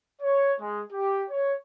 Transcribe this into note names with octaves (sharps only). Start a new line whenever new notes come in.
C#5
G#3
G4
C#5